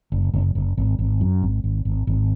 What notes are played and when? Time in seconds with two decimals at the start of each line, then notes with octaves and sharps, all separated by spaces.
0.12 F#1
0.33 F#1
0.55 F#1
0.77 G#1
0.99 G#1
1.21 F#2
1.42 G#1
1.64 G#1
1.85 G#1
2.07 G#1